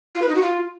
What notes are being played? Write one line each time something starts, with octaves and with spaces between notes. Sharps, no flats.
F4
B4
D#4
F#4
F4